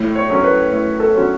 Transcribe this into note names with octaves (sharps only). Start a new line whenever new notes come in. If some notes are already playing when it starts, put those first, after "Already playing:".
Already playing: A2
C#5
F#3 C#4
B4
A2
A4
F#3 C#4 F#4